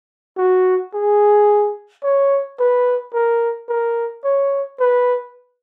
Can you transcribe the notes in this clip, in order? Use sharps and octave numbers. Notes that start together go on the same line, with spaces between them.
F#4
G#4
C#5
B4
A#4
A#4
C#5
B4